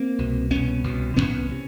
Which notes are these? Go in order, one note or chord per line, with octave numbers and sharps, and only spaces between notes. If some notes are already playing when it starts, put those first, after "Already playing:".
Already playing: A#3 C4
C2 B2
C2 B2 B3 C#4
C2 B2
C2 B2 B3 C#4
C3